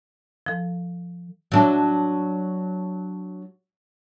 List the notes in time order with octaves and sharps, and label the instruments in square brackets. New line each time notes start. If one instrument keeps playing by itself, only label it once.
[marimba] F3 A4
[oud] F#3 D4